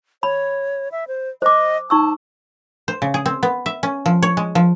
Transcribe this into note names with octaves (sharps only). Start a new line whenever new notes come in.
C#5 B5
E5
C5
C5 D#5 D6
D#4 A5 C#6 E6
C5
C#3
G#4
C4
B3
E5
C#4
F3
C#5
G#3
F3